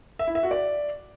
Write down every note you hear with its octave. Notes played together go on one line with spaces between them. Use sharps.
E5
E4
E5
F#4
D5